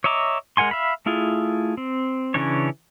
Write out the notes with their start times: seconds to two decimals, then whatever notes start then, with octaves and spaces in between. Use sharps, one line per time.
0.04 C#5 D#5 E5 A#5 D6
0.57 G#3 A#4 F#5 G#5 C6
0.71 E5 F5 B5
1.06 A3 E4 F4 G#4
1.77 C4
2.34 C#3 E3 C#4 D4 C#5